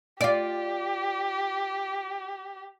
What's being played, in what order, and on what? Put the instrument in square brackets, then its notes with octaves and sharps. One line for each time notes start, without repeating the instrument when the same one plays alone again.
[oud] F4 D5 [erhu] G4